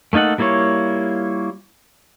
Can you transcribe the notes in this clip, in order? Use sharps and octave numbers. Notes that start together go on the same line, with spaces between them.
A3 A#3 D#4 A4 F#5
G3 A#3 E4 F4 C#5